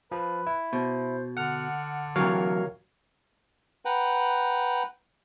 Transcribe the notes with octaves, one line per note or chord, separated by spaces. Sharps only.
F3 B4
E4
B2 C5
D3 F#5 F6
C3 E3 F#3 A#4 C#5 F5
B4 F#5 G5 A#5